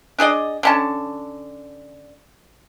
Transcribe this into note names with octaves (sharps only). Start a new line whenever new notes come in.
D4 G#4 D5 D#5
D3 C#4 A5